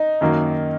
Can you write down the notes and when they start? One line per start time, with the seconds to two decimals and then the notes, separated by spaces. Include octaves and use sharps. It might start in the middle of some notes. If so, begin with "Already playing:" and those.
Already playing: D#4
0.21 F#2 D#3 F#3 A#3